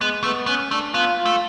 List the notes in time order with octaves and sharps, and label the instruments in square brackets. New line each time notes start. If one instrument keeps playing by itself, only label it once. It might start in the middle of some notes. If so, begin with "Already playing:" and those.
[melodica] G#3 [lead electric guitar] B3
[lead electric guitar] A3 [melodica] B3
[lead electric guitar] B3 [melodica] C#4
[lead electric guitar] A3 [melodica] D4
[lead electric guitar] B3 [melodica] F4
[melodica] F4
[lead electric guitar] A3